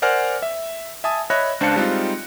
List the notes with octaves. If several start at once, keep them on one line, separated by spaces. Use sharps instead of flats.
A#4 C5 D5 F#5 G#5 F6
E5
E5 G#5 A5 D#6
C#5 D#5 E5 B5 F#6 A#6
C#2 D4 C5 F5 A5 C#7
G3 G#3 C4 D#4 F4